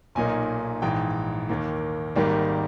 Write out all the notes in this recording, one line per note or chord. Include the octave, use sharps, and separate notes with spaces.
B1 A#2 A#3 D#4 G#5
A#1 G#2 E3 G5
D#2 D#3 A#3
G#1 G#2 D#3 G3 A#3